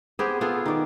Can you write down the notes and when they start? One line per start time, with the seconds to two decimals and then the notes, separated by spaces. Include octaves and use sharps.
0.19 B3 C4 G4 G#4
0.41 B3 F4 G#4 A4
0.66 D#3 D5